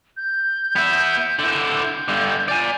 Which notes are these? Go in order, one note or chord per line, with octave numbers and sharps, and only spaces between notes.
G6
B3 E4
D3 E4
G6
G2 D3
D5 G#5